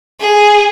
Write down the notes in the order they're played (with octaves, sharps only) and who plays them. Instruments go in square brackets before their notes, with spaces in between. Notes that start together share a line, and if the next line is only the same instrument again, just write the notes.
[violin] G#4